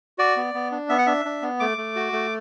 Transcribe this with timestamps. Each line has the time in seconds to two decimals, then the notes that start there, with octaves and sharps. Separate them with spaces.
0.18 F#4 D5
0.37 B3
0.54 B3
0.72 D4
0.89 B3 E5
0.98 F#5
1.06 D4 E5
1.25 D4
1.42 B3
1.60 A3 D6
1.78 A3
1.96 F#4
2.13 A3